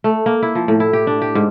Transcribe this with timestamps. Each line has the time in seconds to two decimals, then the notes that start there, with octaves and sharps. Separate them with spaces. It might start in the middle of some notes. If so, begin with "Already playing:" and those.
0.04 A3
0.26 A#3
0.42 E4
0.55 F3
0.68 A2
0.80 E4
0.93 G4
1.07 D4
1.22 G4
1.35 G#2